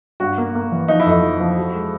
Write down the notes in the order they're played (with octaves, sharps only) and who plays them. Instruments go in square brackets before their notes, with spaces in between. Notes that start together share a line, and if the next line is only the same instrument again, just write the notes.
[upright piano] G2 [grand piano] F#4
[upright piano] A#3
A#3
E3
[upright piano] F3 [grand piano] D#4
[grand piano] E4
[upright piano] F2 [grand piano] D#4
[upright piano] F3
F3
F#4
G#3